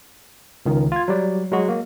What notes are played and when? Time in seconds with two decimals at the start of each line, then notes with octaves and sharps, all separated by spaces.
0.66 C#2 D#3
0.92 F4 G#6
1.08 F#3 G3 D5
1.52 F#3 G#3 F#4
1.69 A#3